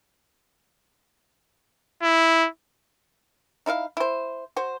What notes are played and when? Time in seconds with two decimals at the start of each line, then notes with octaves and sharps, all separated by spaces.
2.03 E4
3.66 D#4 E4 E5 F5
3.97 E4 C5
4.56 F#4 C5